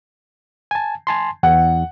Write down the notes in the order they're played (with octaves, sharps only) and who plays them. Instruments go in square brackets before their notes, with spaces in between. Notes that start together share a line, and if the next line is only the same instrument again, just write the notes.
[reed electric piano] G#5 A5
G#5 A5 C6
[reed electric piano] E2 [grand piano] F#5